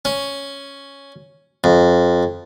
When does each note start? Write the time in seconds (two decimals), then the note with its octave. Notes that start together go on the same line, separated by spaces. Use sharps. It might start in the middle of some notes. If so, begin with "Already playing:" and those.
0.05 C#4
1.64 F2